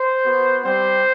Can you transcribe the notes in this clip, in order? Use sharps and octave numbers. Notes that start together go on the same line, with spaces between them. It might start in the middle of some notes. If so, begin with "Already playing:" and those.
Already playing: C5
B3 F#4
G3 C4 G4 C5